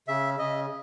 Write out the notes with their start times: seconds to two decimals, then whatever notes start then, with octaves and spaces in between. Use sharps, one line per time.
0.08 C#3 E5
0.38 C#3 D#5